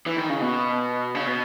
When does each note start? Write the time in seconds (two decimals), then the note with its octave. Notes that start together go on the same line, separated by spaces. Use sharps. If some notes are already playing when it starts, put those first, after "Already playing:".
0.06 E3
0.17 D#3
0.30 C#3
0.41 B2
1.15 C#3
1.26 B2